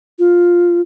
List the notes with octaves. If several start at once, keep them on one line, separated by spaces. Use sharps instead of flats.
F4